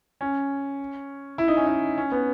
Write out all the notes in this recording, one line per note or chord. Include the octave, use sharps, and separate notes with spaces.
C#4
E4
D#4
C#4
D#4
C#4
B3